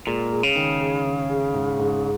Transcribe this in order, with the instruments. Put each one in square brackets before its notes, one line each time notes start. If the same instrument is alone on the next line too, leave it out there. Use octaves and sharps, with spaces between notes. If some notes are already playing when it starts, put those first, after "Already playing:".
[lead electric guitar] A#2 [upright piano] G#3
[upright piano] G#4
[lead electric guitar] C#3
[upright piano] D#3
G#4
D#3
G#4
G#2
G#2